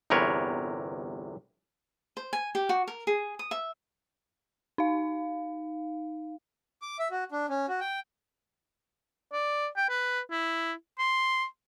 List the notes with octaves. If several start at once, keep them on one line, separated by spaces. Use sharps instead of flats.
G1 E2 C3 A#4 B4 C#5
C5
G#5
G4
F#4
A#4
G#4
D#6
E5
D#4 F5
D6
E5
F#4
D4
C#4
F#4
G5
D5
G5
B4
E4
C6